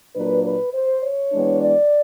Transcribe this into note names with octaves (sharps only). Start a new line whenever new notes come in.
A#2 F#3 A#3 D4 B4
B4
C5
C#5
E3 G#3 B3 D4
D5